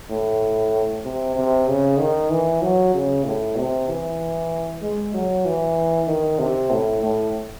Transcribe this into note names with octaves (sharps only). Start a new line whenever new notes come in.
A2
C3
C3
C#3
D#3
E3
F#3
C#3
A2
C3
E3
G#3
F#3
E3
D#3
C3
A2
A2